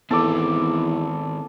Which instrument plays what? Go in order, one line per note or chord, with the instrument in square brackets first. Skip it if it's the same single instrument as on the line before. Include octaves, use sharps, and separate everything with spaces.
[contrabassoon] E2 [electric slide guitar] D#3 C4 [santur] A4 C#5 D6